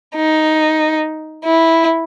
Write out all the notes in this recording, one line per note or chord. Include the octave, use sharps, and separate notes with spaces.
D#4
E4